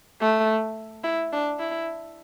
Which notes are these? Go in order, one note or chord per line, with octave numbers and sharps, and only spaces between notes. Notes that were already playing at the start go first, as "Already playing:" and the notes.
A3
E4
D4
E4